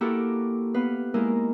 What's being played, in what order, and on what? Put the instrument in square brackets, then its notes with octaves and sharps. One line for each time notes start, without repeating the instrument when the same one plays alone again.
[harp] A#3 E4 F#4 G4 A4 A#4
B3 B4 F5
G#3 A#3 D#4 E4 A#4